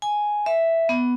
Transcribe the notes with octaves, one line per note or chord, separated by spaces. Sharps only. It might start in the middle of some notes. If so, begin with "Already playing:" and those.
G#5
E5
B3